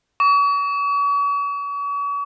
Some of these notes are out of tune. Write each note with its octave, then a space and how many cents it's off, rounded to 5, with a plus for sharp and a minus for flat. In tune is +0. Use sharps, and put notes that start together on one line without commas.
C#6 +40